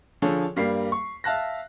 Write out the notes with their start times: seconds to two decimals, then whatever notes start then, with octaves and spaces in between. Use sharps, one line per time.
0.22 D3 F3 G#4 A4 C#5
0.56 G2 G3 A#3 C7
0.92 C#6
1.24 E5 F5 A5 F#6 A#6